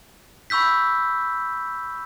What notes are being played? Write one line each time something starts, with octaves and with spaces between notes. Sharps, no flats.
B5 C#6 E6 G6 B6